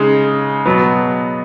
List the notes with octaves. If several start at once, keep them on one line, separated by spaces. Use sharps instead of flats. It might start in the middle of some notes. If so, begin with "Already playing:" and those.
Already playing: C#3 G#3 D#4
B2 F#3 B3